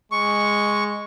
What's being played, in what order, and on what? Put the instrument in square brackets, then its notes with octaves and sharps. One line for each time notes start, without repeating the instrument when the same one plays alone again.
[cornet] G#3 [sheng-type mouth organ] C#6